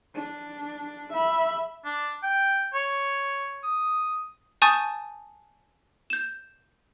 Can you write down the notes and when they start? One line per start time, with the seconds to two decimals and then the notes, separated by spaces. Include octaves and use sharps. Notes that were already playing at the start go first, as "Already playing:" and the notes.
0.15 D4
1.13 E5 B5
1.85 D4
2.23 G5
2.74 C#5
3.64 D#6
4.62 G#5 A5 C#6 D#6 G6 A6
6.10 G6 E7